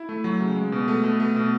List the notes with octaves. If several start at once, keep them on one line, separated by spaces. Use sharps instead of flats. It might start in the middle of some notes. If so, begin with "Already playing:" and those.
Already playing: E4
A3
F#3
C#3
G#3
B2
A3
B2
A3
B2